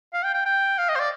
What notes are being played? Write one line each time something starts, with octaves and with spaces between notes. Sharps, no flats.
F5
G5
G5
G5
F5
D#5
C5
D5